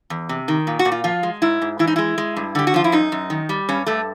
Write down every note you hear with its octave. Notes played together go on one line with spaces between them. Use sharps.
E2
C3
D#3
A#2
F#4
A#2
F4
F3 F4
G#3
G#2 E4
G#2
E3 E4
D#4
G#3 E4
G#3
G2
D3 G4
F#4
F3 F4
E4
F#2 D#4
F#2
D#3
G3
G2 C#4
G2 A3